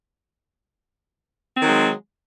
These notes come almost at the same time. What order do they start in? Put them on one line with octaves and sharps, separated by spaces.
C4 D#3 F#3 G#3